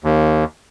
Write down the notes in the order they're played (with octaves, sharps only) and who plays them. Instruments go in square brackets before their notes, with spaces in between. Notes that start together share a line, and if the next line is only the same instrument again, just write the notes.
[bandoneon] D#2